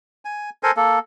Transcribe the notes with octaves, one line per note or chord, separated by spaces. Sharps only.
G#5
A4 A#4 C5 G#5
A#3 A4